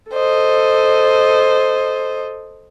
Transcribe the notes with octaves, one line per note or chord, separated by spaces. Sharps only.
A4 C5 D#5